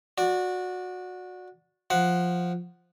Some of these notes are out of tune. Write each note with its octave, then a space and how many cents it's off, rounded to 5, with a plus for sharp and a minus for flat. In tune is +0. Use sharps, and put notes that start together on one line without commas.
F#4 -20 D5 +0
F3 +5 F#5 +0